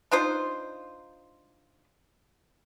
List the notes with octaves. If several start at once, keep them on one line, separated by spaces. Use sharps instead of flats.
D4 D#4 F4 C5